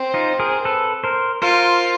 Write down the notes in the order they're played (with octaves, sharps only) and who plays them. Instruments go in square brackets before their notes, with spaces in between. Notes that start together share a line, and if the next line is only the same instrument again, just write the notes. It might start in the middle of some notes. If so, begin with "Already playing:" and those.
Already playing: [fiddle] C4
[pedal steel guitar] D#4 F4
G#4 A#4
A4 B4
A#4 C5
[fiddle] F4 [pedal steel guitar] A#4 C5